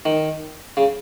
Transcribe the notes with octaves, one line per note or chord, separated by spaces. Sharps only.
D#3
C#3